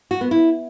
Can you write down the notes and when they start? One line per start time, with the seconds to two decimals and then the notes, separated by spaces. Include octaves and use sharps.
0.11 F#4
0.21 B3
0.31 E4